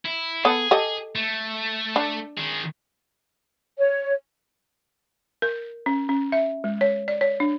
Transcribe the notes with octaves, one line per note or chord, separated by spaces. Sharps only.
E4
B3 G#4 A4
G4 A4 D#5
A3
D4
D#3 G#4
C#5
A#4
C#4
C#4
E5
G#3
C#5
D5
C#5
D4